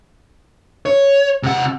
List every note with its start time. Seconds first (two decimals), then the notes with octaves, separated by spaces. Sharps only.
0.86 C#5
1.43 C3 F#5